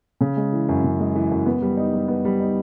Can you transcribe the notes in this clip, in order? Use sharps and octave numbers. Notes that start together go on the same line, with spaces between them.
C#3
G#3
E3
F#2
C#3
G#3
E3
F#2
B3
G3
D#4
G3
B3
G3
D#4